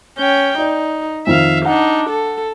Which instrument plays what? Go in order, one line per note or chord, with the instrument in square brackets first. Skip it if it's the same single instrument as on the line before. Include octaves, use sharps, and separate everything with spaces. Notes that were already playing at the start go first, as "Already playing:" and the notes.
[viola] C#4 G5
[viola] D#4 [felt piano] D5
[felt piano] F2 D#3 [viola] E5 F5
[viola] D4 D#4 [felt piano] F#5
[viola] A4